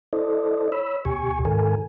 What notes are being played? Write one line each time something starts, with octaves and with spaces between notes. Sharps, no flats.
E4 A4 C5 D5 D#5
C#5 B5 E6
D2 B2 G4 G#5 C#6
G#2 D#3 A4 A#4 G#5